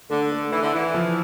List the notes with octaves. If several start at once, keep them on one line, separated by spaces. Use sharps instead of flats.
D3 A3
A3
E3 E4
D3
E3 E4
F3